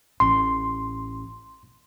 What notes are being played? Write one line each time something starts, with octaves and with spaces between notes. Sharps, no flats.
A1 C6